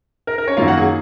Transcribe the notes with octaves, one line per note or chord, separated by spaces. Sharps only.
A#4
A#4
C#4 C#5
F#2 D#3 A#3 F4 F5
F#4 F#5
G#4 G#5